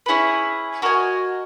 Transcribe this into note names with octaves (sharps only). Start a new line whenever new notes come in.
C#4 E4 G#4 B4
F#4 A#4 D#5 G#5